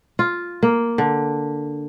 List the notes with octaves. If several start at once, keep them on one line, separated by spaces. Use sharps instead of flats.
F4
A#3
D3